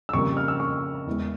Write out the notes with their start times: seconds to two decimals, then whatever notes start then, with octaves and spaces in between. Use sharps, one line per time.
0.09 E6
0.13 F2 C#3 G3 A#3 C#6
0.37 F6
0.48 E6
0.60 C#6
1.06 E2 E3 G#3